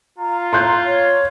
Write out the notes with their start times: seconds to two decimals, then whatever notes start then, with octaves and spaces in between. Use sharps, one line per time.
0.18 F4 A#5
0.53 C6 F#6 G6
0.85 C#5